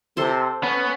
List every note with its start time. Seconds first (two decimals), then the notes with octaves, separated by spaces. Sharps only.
0.17 C3 A4 C5 C6
0.63 B3 C#4